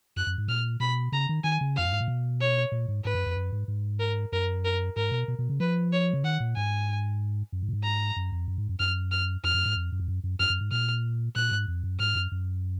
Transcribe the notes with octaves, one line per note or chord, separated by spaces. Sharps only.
F#2 F#6
F#2
G#2
A#2 F6
B2 B5
C#3 A#5
D#3
D#3 G#5
C#3
F2 F5
F#2
G#2
A#2
B2
C#5
A#2
G#2
G#2 B4
F#2
F2
F#2
G#2
G#2
A#4
F#2 A#4
A#4
G#2 A#4
B2
B2
B2
C#3
F3 B4
C#5
C#3
D#3 F#5
A#2
G#2 G#5
F#2
G#2
A#2
G#2
A#5
F#2
F2
F#2
G#2
F#2
F#2 F6
F6
F2 F6
F#2
G#2
F2
F#2
F2
F#2
F#2
F#2 F6
F#2
G#2
A#2 F6
A#2 F#6
G#2
F2
F#2
G#2 F6
F#2
F#2